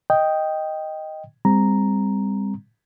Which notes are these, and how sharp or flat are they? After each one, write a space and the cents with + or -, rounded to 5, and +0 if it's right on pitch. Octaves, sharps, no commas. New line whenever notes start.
D#5 +0 G5 +0
G3 +35 C4 -5 A#5 +0